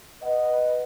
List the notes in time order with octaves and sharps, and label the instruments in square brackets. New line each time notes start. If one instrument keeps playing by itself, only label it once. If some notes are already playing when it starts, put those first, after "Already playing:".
[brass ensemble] B4 D#5 F#5